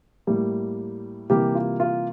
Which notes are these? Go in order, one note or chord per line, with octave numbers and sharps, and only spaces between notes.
A2 G3 A#3
C3 E3 G3 A#3 G4
F4
F4